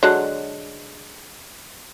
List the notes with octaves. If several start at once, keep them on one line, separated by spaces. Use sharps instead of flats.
D3 F#3 G#3